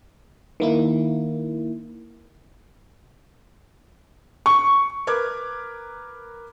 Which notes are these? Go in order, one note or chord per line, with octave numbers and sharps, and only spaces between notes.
D#3 A#3 E4
C#6
A#4 B4 D6 F6 G#6